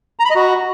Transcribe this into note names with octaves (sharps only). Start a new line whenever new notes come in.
A#5
B5
D#5
F#4